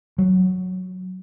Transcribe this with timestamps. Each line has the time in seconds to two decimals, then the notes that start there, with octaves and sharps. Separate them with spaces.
0.18 F#3